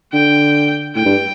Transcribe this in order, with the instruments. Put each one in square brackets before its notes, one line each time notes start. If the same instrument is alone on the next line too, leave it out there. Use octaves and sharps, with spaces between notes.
[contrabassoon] D3 [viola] G5
[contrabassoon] A2 [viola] G5
[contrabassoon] G2